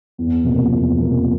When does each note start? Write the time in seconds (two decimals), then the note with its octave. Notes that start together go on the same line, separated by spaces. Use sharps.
0.18 E2
0.44 C3 F3 A#3
0.72 E2
0.98 C3 F3 A#3